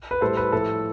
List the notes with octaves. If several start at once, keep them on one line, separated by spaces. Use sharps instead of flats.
B4
A2 G3 A4 C5
B4
A2 F3 A4